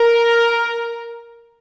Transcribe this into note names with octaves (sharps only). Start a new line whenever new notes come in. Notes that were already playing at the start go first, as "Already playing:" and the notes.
Already playing: A#4